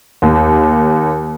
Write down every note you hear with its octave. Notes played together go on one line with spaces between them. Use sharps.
D#2